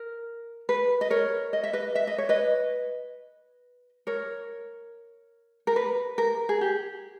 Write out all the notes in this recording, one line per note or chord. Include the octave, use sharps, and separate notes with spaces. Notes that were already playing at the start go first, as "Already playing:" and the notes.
Already playing: A#4
B4
D#5
A#4 C#5
D#5
E5
B4 D#5
E5
D#5
C#5
B4 D#5
A#4 C#5
A#4
B4
A#4
G#4
G4